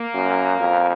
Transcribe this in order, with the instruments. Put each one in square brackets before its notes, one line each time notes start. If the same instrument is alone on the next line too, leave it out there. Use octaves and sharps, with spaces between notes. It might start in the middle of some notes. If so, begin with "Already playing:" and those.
Already playing: [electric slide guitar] A#3
[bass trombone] F#2
F2